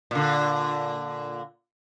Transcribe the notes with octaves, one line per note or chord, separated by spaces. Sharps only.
A#2 D3